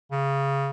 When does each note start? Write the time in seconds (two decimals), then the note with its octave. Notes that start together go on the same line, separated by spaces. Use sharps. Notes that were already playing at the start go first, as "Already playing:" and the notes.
0.11 C#3